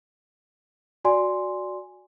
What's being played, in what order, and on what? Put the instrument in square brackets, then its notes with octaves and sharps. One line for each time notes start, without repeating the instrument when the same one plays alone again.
[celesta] F#4 D5 G#5 C6